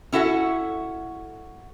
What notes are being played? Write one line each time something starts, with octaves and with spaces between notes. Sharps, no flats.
C#4 E4 F#4 A4 F#5